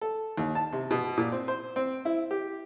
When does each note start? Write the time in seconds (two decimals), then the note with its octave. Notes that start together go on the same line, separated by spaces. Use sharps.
0.01 A4
0.37 D#2
0.55 A5
0.72 C3
0.91 B2
1.17 A#2
1.32 C4
1.48 C5
1.76 C4
2.05 E4
2.31 G4